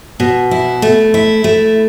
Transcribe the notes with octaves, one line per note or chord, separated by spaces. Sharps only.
B2
E4
A3
E4
A3